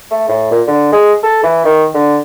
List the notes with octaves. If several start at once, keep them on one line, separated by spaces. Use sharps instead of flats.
A3
A2
A#2
D3
G#3
A4
E3
D#3
D3